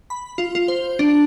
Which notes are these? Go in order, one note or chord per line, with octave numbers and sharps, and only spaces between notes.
B5
F4
F4
C5
D4